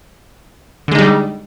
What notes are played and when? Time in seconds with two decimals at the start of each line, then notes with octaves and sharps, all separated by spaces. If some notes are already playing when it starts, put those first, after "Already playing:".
0.88 D3
0.92 G#3
0.95 D#4
0.99 G3